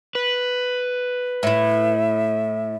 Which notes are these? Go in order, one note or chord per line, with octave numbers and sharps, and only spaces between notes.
B4
A2 E4 E5